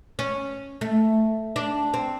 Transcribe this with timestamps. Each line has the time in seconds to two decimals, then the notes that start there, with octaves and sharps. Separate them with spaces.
0.19 C#4
0.81 A3
1.56 D4
1.94 C4